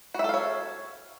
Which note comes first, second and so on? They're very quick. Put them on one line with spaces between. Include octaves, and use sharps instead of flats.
F#4 E5 A4 F5 C#5